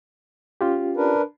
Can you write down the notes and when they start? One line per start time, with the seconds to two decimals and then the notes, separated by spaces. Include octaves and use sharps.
0.61 C#4 F4 G4
0.97 D4 A#4 B4